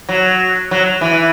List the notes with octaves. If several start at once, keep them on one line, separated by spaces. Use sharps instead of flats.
F#3
F#3
E3